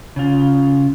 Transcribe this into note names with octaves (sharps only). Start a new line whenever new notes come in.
C#3 F4